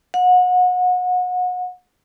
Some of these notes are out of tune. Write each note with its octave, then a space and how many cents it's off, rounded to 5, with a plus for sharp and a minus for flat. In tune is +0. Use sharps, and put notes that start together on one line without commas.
F#5 -30